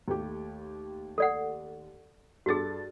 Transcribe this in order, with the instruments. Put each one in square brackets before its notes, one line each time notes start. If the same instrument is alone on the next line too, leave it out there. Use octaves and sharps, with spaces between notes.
[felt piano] D#2 A3 G4
[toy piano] A4 D5 F#5
[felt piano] G2 A4 A6 [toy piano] F#4 G#4